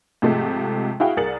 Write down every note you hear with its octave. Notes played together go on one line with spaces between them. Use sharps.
G#2 C3 F3 G#3 A3
E4 F#4 G#4 F5 G5
C2 G#4 A#4 A6 C#7 F#7